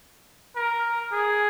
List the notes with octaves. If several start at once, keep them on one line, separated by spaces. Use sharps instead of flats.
A#4
G#4